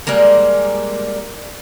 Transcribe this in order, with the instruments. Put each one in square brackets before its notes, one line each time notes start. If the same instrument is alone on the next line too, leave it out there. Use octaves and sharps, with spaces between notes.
[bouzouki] G3 G#3 A#3 A#4